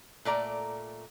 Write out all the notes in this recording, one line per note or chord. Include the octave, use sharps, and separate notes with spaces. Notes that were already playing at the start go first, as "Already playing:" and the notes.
A#2 A3 D5 A#5